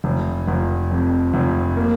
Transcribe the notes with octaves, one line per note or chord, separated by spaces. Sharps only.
F1
F1
F2
F1
A#3